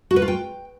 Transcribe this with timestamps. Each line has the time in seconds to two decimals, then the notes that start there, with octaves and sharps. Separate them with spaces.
0.11 F#4
0.16 B4
0.22 F4
0.28 G5